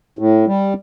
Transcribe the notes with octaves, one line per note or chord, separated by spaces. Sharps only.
A2
G3